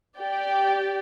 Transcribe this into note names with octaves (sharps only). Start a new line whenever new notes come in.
G4 D5 G5